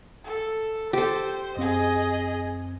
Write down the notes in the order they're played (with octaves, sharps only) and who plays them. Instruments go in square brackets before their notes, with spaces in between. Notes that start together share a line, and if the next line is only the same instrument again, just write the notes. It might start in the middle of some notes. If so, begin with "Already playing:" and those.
[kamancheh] A4
[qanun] G4 A4 [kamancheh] C5
[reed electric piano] F#2 C4 [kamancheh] G#4 D#5